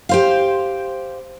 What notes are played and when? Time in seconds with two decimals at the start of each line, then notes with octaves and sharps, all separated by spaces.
0.09 G4 C5 F5